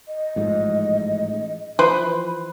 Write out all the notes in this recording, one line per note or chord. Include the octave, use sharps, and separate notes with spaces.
D#5
A1 G#2 F3
E3 F3 B4 C5 B5